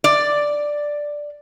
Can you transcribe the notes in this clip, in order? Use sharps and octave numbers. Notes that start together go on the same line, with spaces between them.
D5